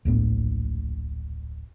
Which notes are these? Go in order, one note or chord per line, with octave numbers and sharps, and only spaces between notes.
D1 A#1 A2 B3